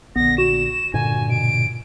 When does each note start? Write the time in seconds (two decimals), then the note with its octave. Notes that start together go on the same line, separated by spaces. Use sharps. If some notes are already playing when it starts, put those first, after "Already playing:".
0.16 A#1 D3 B3 A#6
0.38 F#4 E7
0.94 G2 A#2 D3 G#5
1.30 B2 D7